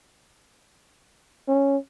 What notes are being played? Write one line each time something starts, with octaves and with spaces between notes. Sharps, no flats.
C#4